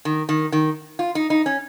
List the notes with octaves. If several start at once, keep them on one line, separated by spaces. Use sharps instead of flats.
D#3
D#3
D#3
F4
D#4
D#4
C#4